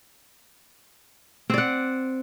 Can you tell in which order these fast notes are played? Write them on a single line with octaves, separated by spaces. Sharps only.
C4 D5 F#5